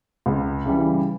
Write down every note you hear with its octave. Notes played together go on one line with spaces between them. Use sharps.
C#2
C#3 E3 G3